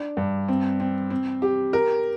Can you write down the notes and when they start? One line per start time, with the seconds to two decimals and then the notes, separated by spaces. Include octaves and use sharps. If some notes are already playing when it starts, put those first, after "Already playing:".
Already playing: D4
0.17 G2
0.48 C4
0.80 C4
1.10 C4
1.42 G4
1.73 A#4